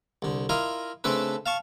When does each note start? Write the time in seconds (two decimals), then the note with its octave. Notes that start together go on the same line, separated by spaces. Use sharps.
0.22 C2 D3
0.49 E4 F4 A#4 D#5 F5
1.04 C#3 A3 C4 D4 A4 B4
1.46 F5 A5 C#6